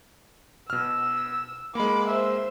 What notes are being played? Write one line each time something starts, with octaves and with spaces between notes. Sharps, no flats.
B2 E6 F6
G#3 A#3 B5 D6
C5 E5